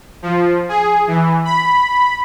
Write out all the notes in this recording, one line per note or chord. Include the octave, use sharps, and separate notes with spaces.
F3
G#4
E3
B5